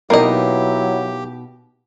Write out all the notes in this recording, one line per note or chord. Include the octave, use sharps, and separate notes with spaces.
B2 F#3 A#3 B3 D#4 E4 G4 D#5